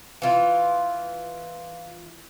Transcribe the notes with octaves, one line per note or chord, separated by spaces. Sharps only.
E3 F4